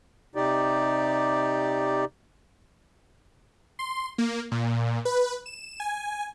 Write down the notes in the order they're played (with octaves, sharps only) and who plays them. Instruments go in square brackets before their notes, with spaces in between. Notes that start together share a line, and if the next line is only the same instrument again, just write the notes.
[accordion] C3 D#4 G4 D5
[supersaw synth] C6
A#3
A#2
B4
E7
G#5